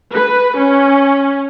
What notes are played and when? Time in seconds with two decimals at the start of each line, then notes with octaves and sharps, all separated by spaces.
0.13 B4
0.58 C#4